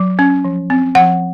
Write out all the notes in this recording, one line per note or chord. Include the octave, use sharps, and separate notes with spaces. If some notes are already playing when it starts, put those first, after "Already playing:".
Already playing: F#3
C#4
F3
C4
F3 F#5